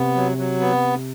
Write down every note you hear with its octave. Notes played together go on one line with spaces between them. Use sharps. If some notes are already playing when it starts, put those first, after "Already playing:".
Already playing: C3 B3
F#3
F#3
B3